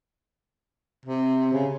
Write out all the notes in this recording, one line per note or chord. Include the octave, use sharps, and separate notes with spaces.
C3
C#3